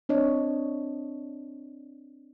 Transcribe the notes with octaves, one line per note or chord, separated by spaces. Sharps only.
C4 D4 C#5 D#5